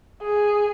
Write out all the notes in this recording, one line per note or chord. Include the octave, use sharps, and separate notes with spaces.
G#4